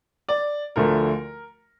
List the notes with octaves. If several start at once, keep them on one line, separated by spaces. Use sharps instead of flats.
D5
D2 D3 F3 A3 A#4